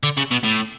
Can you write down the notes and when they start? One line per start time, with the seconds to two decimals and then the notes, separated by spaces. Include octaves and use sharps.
0.03 D3
0.17 C#3
0.31 B2
0.44 A2